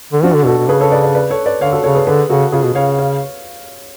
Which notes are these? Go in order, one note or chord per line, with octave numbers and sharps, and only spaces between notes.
D3
F3 D4 F#4
D3
B2 F#4 A4
B2
C#3 G#4 B4
A4 C#5
B4 D5
B4 D5
B4 D5
A4 C#5
B4 D5
D3 C#5 F5
F#4 A4
C#3 A4 C#5
G#4 B4
D3 G#4 B4
C#3 F#4 A4
C#3 F4 G#4
B2
C#3 C#5 F5
C#5 F5